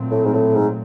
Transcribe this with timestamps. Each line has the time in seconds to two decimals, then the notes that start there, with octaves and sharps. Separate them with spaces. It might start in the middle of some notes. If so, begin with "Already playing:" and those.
Already playing: A#2 F#3 A3 C4
0.11 A2
0.25 G#2
0.34 A2
0.55 G#2